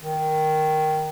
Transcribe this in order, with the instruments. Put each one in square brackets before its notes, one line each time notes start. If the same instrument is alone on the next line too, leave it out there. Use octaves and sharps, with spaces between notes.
[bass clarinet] D#3